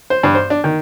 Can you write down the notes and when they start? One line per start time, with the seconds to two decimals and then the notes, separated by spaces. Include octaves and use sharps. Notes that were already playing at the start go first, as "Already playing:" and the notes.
0.10 C5
0.23 G2
0.35 C5
0.50 D4
0.64 D#3